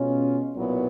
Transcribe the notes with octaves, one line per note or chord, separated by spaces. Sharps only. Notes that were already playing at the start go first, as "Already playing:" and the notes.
Already playing: B2 G#3 C#4 F4
B1 A#2 F#3 B3 E4